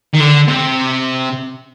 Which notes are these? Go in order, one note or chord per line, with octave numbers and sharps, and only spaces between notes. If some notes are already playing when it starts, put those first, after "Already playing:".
D#3
D3
C3